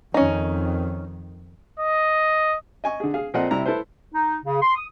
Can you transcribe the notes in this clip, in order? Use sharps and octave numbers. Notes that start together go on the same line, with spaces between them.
F2 D#3 C#4 D#4
D#5
D#5 G#5 C#6
D3 G#4
G#4 F5
A#2 F3 C4 A4 D#5 F#5
C3 G3 E4 A#5
E4 A4 B4 C5
D#4
C#3
C6
D#6